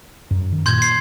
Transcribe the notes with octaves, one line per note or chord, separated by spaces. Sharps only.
F#2
D#3
A#2 C6 G6 G#6
C7